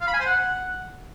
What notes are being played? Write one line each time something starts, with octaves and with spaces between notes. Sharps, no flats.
F5
B5
G#5
C5
F#5